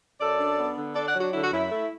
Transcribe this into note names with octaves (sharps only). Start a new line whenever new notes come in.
F#2 A4 D5
D4
B3
D3
D4 A4 D5
D5 F#5
F#3
D4 F#4
D3 E4
F#4
F#2 E4
A3